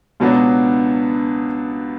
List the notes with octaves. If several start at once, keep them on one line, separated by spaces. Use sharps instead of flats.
C#2 B2 F#3 B3 D4